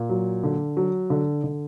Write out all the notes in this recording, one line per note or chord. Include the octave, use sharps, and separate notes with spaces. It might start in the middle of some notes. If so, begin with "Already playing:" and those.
Already playing: A#2
F#3
D3
F#3
D3
D3